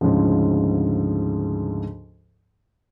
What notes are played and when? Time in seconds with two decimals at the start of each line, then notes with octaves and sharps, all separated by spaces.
0.01 D2 G#2 C#3 F3